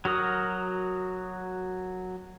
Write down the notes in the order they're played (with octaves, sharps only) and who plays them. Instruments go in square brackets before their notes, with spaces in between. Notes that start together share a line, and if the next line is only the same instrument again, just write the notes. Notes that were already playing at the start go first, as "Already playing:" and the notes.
[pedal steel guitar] F#3 F#4 A#4 D#6